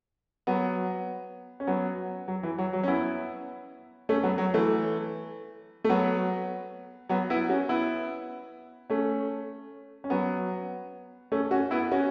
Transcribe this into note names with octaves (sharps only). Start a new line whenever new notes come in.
F#3 B3
C#4
F#3 B3
F#3
E3
F#3
F#3
C#4
B3 E4
A3 C#4
F#3 B3
F#3
E3 A3
A3
F#3 B3
F#3 B3
B3 E4
C#4 F#4
B3 E4
A3 C#4
C#4
F#3 B3
A3 C#4
C#4 F#4
B3 E4
C#4 F#4